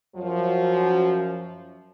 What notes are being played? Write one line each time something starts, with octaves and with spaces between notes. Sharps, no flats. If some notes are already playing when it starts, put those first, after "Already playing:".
F#2 F3 F#3